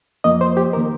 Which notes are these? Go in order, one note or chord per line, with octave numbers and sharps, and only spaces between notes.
F2 F3 A#3 D#5
C5
G4
A#4
D#3 A#3